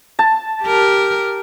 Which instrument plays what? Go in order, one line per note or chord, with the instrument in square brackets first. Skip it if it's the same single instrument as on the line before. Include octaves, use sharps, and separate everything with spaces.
[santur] A5
[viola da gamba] G4 A#4